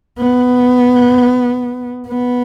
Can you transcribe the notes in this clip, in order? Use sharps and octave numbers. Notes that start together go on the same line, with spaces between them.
B3
B3